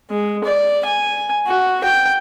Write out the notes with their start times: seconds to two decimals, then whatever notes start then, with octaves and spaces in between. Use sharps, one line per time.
0.10 G#3
0.44 D5
0.86 G#5
1.47 F#4
1.84 G5